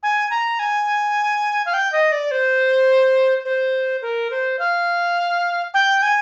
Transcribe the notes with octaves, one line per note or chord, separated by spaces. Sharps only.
G#5
A#5
G#5
F5
G5
D#5
D5
C5
C5
A#4
C5
F5
G5
G#5